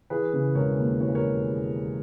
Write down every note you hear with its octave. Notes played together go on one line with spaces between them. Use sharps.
E3 G#4 B4
C#3
E1 A#4 C#5
D#2
E3 C#5
B4
A#4 C#5